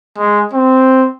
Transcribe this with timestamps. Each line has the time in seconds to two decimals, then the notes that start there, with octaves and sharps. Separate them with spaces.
0.18 G#3
0.53 C4